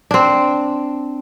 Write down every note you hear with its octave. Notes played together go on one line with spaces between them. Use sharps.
C4 D4